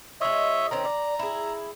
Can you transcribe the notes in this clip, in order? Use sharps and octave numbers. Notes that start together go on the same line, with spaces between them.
G#3 F4 C#5 D#5 E5
D#3 C4 C#4 A#5
D5
E4 G#4